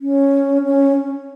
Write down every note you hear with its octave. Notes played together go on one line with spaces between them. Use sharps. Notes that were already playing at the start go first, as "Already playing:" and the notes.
C#4
C#4